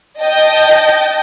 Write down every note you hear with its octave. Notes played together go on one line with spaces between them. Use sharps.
D#5 G5 A5 G6